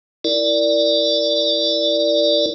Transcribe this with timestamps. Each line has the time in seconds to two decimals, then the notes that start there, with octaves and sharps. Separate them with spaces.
0.25 E4 A#4 D5